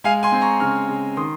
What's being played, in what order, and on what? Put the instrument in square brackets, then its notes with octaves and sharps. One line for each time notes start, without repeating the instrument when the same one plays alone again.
[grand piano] G#3 F5 G#5
G#5 C6
C4
A#5 C#6
C#3 C#6 F6
C#3
D#3 C6 D#6